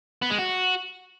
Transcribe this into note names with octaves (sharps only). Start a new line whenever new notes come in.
B3
G#3
F#4